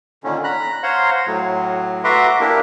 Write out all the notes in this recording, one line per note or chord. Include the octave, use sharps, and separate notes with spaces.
A#2 D3 D#3 C#4
A#5 B5 F#6
C5 C#5 F5 F#5 A#5 C6
A2 F#3
F#4 B4 E5 A#5 C6 D6
A#3 D4 E4 G4 A#4